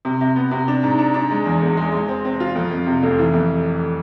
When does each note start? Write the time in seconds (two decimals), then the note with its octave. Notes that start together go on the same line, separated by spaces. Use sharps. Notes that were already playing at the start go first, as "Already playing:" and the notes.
0.05 C3
0.21 C3
0.36 B3
0.51 C3
0.68 D4
0.83 G#2
0.99 D4
1.14 D4
1.31 G#3
1.46 E2
1.62 E1
1.77 G#3
1.92 G#3
2.08 C4
2.25 C4
2.40 F4
2.55 F2
2.71 F2
2.86 C3
3.03 F1
3.19 E3
3.34 F2